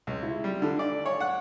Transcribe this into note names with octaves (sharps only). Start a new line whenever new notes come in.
C#2
E4
G3
D3
D5
C#5
F#5